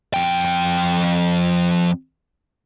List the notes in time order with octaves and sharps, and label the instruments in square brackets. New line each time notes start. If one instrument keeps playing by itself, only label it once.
[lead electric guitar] F2 G5